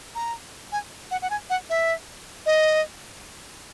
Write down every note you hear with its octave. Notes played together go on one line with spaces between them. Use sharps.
A#5
G#5
F#5
F#5
G#5
F#5
E5
D#5